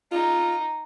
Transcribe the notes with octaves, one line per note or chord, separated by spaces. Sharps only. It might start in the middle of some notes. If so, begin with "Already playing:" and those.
D#4 F4